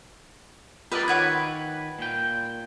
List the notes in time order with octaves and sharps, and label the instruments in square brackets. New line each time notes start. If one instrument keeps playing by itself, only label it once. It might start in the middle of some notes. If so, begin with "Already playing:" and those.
[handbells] F4 E6 [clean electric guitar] G4 A#4 D5 [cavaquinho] B4 D#5
[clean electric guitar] D#3 B4 [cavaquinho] C#5 F#5 D6 [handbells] B5 G#6
[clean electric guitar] A#2 G5